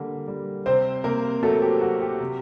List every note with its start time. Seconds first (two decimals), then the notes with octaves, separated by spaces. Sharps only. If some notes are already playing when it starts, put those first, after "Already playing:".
Already playing: D3 G3 A#3
0.28 G3
0.66 C3 C4 C5
1.04 C3 A#3 A#4
1.43 F#3 A3 A4
1.62 G4
1.81 F#3 F#4
2.01 G4
2.20 C3